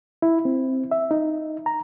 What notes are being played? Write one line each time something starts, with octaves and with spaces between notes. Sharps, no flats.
E4
C4
E5
D#4
A#5